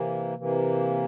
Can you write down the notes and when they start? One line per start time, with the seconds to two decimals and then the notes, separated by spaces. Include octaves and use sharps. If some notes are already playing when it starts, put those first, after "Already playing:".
Already playing: C3 E3 A#3
0.38 C3 E3 A#3